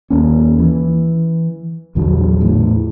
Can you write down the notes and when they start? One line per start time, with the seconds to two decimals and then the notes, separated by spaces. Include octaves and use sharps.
0.10 D#2 A#3 C#4
0.59 E3
1.95 A#1 E2 D3 F#3
2.41 E2 A2 E3